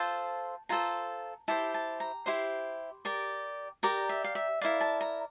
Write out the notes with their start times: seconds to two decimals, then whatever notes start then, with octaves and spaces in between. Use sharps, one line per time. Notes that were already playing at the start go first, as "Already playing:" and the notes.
Already playing: F4 A4 C5 A5
0.69 F4 A4 C5 A#5
1.48 E4 G4 C5 A5
1.74 A5
2.00 A#5
2.26 E4 G4 C5 C6
3.05 G4 A#4 D5
3.83 G4 A#4 D5 A#5
4.09 E5
4.24 F5
4.35 E5
4.61 E4 A#4 D5 F5
4.81 A5
5.01 A#5